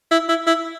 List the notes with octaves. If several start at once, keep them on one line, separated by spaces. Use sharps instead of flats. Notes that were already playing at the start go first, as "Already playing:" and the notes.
E4
E4
E4